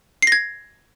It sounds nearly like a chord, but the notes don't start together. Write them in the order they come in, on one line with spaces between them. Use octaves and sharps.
C7 A#6 G#6